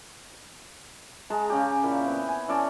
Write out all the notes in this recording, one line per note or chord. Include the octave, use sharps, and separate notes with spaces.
G#3 G#4 A5 A#5
C#3 C#4 G4
A#2 A#3 E4
B3 C4
G#5
E3 C#4 A4 D5